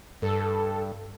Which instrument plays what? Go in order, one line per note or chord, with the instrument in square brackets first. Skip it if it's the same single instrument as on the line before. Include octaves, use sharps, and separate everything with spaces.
[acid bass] G2 [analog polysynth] A4